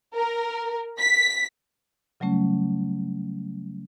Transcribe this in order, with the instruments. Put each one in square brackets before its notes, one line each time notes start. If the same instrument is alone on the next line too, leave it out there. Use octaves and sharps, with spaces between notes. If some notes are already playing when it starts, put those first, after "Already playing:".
[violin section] A#4
B6
[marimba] C#3 F#3 G3 A3 C#4